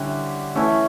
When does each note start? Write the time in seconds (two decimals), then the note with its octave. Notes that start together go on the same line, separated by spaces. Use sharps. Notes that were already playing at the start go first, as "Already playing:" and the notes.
Already playing: D3 G3 C#4 E4 G4
0.55 E3 A3 C#4 E4 A4